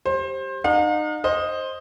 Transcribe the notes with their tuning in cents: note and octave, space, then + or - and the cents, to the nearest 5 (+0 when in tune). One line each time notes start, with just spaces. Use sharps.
G3 +0 C5 +25
D#4 -30 F5 +45
C5 +15 D#5 +0